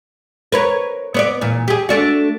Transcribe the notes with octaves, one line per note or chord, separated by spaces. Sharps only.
A#4 B4 C#5
B3 C#5 D5
E2 A#2
G4 G#4
A3 D4 F#4